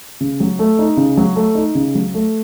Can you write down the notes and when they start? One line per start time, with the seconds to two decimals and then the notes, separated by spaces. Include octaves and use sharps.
0.21 C#3
0.40 F#3
0.59 A3
0.79 D#4
0.97 C#3
1.17 F#3
1.36 A3
1.55 D#4
1.75 C#3
1.95 F#3
2.14 A3